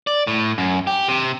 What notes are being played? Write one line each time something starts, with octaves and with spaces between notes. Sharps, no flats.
D5
A2
F#2
G4
C3